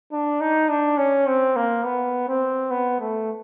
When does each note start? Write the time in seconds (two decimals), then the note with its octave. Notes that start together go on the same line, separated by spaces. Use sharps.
0.12 D4
0.40 D#4
0.69 D4
0.98 C#4
1.27 C4
1.56 A#3
1.84 B3
2.28 C4
2.71 B3
3.00 A3